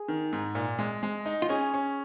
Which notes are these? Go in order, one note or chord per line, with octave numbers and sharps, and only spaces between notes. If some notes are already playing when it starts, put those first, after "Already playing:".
Already playing: G#4
D#3
G#2
A#2
G#3
G#3
D#4
F4
C#4 G#4
C#4